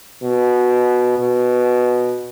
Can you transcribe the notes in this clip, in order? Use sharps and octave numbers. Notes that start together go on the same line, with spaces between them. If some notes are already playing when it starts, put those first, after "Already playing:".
B2
B2